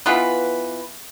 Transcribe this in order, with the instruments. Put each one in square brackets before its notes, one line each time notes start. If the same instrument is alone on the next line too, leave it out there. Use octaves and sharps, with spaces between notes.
[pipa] E3 B3 F4 B4